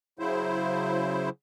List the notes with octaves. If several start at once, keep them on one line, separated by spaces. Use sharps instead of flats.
C#3 F#3 E4 C5